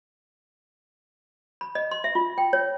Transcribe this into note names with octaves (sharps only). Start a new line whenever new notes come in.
B5
D#5
C6
E5
F4
G5
C#5